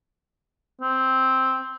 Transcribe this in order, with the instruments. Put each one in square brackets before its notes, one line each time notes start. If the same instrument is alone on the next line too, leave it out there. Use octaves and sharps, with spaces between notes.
[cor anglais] C4